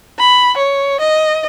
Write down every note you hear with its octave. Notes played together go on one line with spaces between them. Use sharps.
B5
C#5
D#5